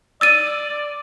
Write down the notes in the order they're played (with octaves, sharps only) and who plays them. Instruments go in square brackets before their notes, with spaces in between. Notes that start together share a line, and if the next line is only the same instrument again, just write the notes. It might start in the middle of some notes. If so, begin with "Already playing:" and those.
[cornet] D5 [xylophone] E6 A6 D#7